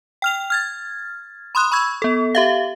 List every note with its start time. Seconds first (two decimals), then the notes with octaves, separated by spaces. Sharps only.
0.22 G5 F6 F7
0.50 F6 G#6 A6
1.55 B5 C6 D#6 F#6
1.72 B5 C#6 E6 G#6
2.02 B3 A4
2.35 G4 E5 F5